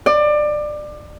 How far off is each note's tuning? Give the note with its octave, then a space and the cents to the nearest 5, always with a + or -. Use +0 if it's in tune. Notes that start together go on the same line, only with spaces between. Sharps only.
D5 +25